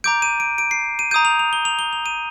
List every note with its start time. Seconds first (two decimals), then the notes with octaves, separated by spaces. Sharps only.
0.04 A#5 D6 G6 D7
0.22 D#7
0.40 D7
0.58 D7
0.71 C7
0.99 D#7
1.11 A#5 D#6 G6 D#7
1.25 F7
1.39 F7
1.53 G7
1.65 F7
1.79 G7
1.93 F7
2.06 D#7